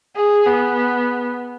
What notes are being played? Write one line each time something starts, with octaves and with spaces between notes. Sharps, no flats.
G#4
B3